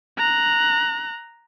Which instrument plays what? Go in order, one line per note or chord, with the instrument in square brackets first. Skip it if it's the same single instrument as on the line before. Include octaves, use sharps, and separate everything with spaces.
[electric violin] A#5 F#6